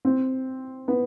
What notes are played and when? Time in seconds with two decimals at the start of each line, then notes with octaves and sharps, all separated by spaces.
0.05 C4
0.88 B3